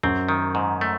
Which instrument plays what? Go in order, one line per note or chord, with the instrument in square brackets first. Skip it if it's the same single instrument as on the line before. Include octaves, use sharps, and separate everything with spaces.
[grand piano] F#2 [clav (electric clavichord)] C4
[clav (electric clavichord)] D#3
G#2
A3